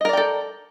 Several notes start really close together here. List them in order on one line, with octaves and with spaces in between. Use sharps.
D#5 A#4 D5 G5 A4